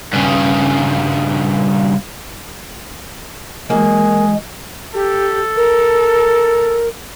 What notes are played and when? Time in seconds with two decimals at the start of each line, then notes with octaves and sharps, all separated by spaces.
0.13 G2 C#3
3.70 E3 F#3 G#3 A#3 G#4
4.94 G4 A4
5.56 A#4